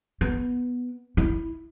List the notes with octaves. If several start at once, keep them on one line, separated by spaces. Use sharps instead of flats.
B3
E4